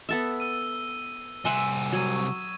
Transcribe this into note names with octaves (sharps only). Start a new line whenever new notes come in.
B3 A4 E5
E6 D#7
C2 E5 F#5 G#5 C6
F#3 D#6 G#6 D#7
C#6